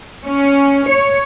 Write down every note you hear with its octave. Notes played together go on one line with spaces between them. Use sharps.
C#4
C#5